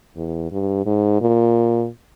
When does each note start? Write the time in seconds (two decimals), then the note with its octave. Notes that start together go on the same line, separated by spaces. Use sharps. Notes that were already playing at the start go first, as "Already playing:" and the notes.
0.16 E2
0.51 G2
0.86 G#2
1.21 A#2